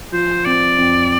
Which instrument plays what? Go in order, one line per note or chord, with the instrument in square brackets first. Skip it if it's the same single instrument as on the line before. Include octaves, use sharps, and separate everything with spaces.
[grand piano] F3 [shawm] C5
[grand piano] C4 [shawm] D5
[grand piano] F2